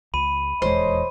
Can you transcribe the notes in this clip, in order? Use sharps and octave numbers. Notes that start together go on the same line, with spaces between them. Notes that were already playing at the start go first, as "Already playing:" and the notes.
C#2 B5 D#7
D#1 E2 G#3 A4 C5 C#5 D#5